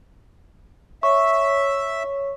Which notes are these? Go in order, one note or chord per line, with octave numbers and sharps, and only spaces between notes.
C#5 E5 C#6